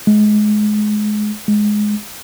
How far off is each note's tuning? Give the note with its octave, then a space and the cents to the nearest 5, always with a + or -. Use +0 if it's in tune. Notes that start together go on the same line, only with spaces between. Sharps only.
G#3 +25
G#3 +10